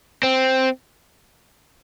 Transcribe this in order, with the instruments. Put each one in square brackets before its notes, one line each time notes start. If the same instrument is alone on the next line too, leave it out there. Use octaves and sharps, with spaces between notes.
[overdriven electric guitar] C4